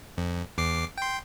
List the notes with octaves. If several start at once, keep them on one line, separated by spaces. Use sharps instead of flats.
F2
E2 D6 C7
G5 C6